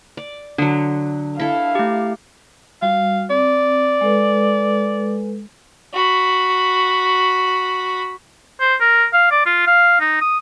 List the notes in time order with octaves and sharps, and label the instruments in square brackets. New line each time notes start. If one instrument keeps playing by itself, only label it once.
[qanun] D5
[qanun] D3 F#3 [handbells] D4
[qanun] E4 A4 [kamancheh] F5
[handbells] A3 G4
[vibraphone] G3 F#4 [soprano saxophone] F5
[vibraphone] C4 [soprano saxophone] D5
[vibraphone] G#3 A4 B4
[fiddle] F#4 B5
[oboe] C5
A#4
F5
D5
F4
F5
D#4
D#6